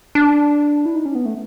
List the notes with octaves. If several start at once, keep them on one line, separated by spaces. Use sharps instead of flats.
D4
E4
D#4
C#4
B3
A3